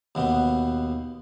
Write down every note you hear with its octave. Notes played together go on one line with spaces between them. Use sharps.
D#2 B2 B3